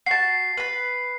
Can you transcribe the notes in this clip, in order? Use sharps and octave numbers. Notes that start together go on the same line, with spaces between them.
F#4 A5 C7
B4 B5